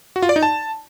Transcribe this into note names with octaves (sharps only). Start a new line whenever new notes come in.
F#4
F4
D5
D#4
A5